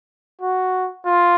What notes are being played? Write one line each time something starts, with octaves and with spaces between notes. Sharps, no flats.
F#4
F4